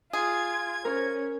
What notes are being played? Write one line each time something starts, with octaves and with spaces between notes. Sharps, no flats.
F4 G#4 G#6
C#4 A#4 C#5